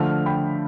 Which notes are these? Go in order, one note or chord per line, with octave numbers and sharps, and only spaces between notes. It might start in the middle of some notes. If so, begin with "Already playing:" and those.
Already playing: D3 F3 A3 F6
G5 B5